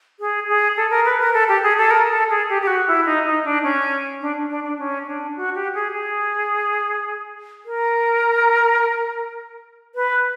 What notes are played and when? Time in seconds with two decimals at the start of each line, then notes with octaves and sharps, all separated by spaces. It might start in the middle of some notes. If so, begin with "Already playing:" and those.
0.20 G#4
0.48 G#4
0.77 A4
0.90 A#4
1.05 B4
1.20 A#4
1.34 A4
1.49 G4
1.63 G#4
1.78 A4
1.91 A#4
2.10 A4
2.30 G#4
2.49 G4
2.62 G4
2.67 F#4
2.87 E4
3.06 D#4
3.26 D#4
3.45 D4
3.63 C#4
4.21 D4
4.50 D4
4.64 D4
4.79 C#4
5.07 D4
5.36 F#4
5.55 G4
5.74 G#4
5.93 G#4
7.66 A#4
9.95 B4